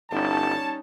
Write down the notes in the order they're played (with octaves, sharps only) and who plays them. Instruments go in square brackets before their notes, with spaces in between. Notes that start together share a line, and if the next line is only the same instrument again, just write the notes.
[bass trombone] G1 [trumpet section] G3 C#5 A5 [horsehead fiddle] C#4 D#4